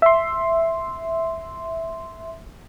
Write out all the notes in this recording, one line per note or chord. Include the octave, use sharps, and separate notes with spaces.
E5 C6